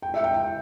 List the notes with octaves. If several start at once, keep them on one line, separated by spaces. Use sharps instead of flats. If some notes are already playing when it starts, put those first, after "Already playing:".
G5
E5
G5
G5